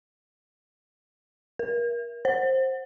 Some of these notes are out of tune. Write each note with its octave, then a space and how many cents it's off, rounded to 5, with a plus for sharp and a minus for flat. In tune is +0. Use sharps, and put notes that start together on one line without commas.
A#4 +30
C5 +15